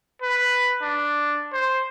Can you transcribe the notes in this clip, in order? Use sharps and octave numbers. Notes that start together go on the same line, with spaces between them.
B4
D4
C5